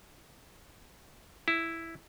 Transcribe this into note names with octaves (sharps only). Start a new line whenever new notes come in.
E4